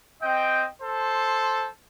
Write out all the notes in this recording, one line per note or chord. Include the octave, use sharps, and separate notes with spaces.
C4 D#5 G5
A4 C5 C6